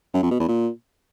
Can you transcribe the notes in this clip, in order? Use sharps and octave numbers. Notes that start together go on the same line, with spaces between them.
F#2
F2
B2
E2
A#2